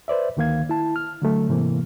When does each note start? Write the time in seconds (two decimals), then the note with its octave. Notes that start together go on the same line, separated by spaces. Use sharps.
0.08 B4 C5 D5 E5
0.37 D2 D#3 A#3 F5 G#6
0.69 E4 A5
0.96 F6
1.22 D3 F#3 A3
1.49 G#2 C3 E3 A#3